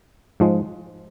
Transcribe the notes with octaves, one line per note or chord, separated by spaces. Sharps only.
G#2 F3 G#3